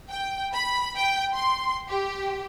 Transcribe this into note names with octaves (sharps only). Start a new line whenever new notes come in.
G5
B5
G5
C6
G4